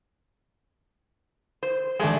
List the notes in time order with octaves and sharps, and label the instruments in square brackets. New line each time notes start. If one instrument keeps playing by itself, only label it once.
[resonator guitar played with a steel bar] C5
[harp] D#3 G4 [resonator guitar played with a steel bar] G#3 A3 D4